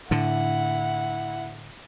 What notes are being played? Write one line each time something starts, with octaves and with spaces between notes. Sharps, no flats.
A2 D3 E4 F#5